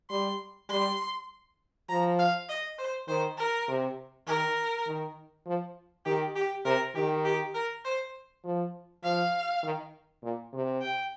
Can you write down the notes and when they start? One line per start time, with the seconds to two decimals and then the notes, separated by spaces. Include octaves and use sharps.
0.10 G3 C6
0.70 G3 C6
1.89 F3 A#5
2.19 F5
2.49 D#5
2.78 C5
3.08 D#3 C5
3.38 A#4
3.68 C3
4.27 D#3 A#4
4.87 D#3
5.46 F3
6.05 D#3 G4
6.35 G4
6.65 C3 A#4
6.95 D#3 G4
7.25 G4
7.54 A#4
7.85 C5
8.44 F3
9.03 F3 F5
9.63 D#3
10.23 A#2
10.53 C3
10.82 G5